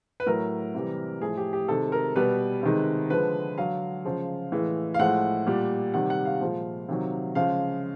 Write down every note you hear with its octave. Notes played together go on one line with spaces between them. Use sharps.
B4
A2 F#3 A#4
C3 E3 G3
A2 F3 G#3 G#4
G4
G4
C3 D#3 G#3 A4
A#4
B2 G3 B4
C3 D#3 G#3
D3 F3 G#3 B4
D3 F#3 F5
C#3 F3 G#3
A2 E3 G#3
F5
A2 F3 G#3 F#5
A#2 G3
C3 D#3 G3 F#5
F#5
F5
A#2 F3 G#3
C3 D#3 F#3
C#3 F3 G#3 F5